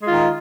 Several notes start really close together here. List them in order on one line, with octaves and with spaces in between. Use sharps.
G#3 F4 D#3